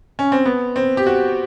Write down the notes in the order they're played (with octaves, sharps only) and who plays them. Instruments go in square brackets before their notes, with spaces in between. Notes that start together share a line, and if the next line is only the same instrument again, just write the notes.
[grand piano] C#4
C4
B3
C4
G4
F#4